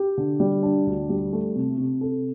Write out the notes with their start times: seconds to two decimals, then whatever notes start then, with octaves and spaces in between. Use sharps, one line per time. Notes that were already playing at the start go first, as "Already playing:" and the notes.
Already playing: G4
0.18 D3
0.40 G3
0.63 D4
0.87 D2
1.09 G3
1.33 A3
1.56 C3
1.78 C3
2.01 A4